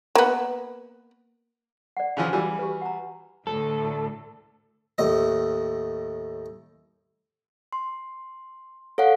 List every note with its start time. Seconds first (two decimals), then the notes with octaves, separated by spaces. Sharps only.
0.15 A#3 B3
1.97 D5 F#5
2.17 C#3 E3 F3
2.33 E3 G3 F#4
2.59 G4 B4
2.82 F#5 A#5
3.47 D2 A2 A4
4.98 D#2 A2 D#5
7.73 C6
8.98 A4 C#5 F5 F#5